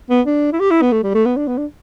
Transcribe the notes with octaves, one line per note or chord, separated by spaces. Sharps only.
B3
D4
E4
G4
E4
B3
A3
G3
A3
B3
D4
B3
D4